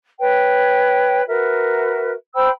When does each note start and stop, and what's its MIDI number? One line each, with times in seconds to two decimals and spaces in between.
0.20 1.21 71
0.20 1.21 73
0.20 1.21 79
1.28 2.11 66
1.28 2.11 70
1.28 2.11 71
1.28 2.11 76
2.34 2.49 72
2.34 2.49 79
2.34 2.49 83
2.34 2.49 88